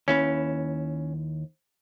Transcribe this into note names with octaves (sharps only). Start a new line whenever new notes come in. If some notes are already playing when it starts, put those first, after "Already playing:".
D#2 C#4 E4 B4